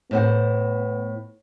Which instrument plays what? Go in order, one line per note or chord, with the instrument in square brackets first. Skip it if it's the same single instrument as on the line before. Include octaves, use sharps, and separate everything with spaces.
[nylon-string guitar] A2 C5 F#5 [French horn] B3